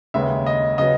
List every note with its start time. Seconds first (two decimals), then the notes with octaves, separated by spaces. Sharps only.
0.14 D#2 C#3 G#3 B3 E5
0.46 D#5
0.78 C#3 F#3 B3 D#5